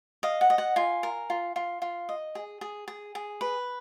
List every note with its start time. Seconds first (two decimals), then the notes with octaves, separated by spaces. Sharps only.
0.23 D#5 F5
0.41 F#5
0.50 D#5
0.58 F#5
0.76 F4 G#5
1.03 A#4
1.30 F4
1.56 F4
1.82 F4
2.09 D#5
2.35 G#4
2.61 G#4
2.88 G#4
3.15 G#4
3.41 B4